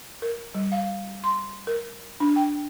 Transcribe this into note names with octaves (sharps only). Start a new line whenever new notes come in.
A#4
G3
F5
C6
A#4
D4
G5